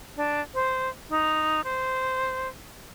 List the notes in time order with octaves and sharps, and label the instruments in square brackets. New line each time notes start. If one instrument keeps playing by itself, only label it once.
[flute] D4
C5
D#4
C5